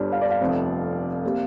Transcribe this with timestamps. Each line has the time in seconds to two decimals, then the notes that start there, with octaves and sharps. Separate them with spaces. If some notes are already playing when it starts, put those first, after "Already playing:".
Already playing: G1 G2 G3 D4 F4 D5
0.12 F5
0.21 D5
0.30 F5
0.40 F1 F2 C3
1.24 C3 A#3 G4